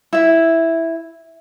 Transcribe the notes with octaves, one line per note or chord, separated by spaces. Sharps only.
E4 E5